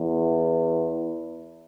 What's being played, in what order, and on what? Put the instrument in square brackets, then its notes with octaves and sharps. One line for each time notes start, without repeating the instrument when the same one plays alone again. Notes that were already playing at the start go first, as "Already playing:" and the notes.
Already playing: [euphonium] E2